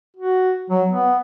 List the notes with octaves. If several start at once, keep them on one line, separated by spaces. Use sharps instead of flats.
F#4
F#3
B3